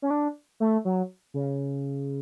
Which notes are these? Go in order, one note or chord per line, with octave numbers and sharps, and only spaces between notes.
C#4
D4
A3
F#3
C#3